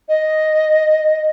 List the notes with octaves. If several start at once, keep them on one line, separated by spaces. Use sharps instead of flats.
D#5